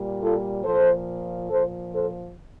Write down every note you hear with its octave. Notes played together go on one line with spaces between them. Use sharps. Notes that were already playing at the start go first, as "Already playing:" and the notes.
Already playing: A#2 G3
F4 A4
A#2 F3 A4 C5
A#2 F3 A4 C5
A4 C5